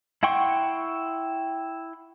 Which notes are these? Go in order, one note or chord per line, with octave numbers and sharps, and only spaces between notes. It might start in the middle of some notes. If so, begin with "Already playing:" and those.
E4 F#5 G5 C6 C#6